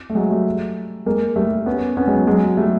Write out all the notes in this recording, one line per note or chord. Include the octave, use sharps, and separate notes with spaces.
A3
F#3 G#3
G3 A3
G#3 A#3
G3 A3
B3 C#4
B3 C#4
F#3 G#3
F#3 G#3
G3 A3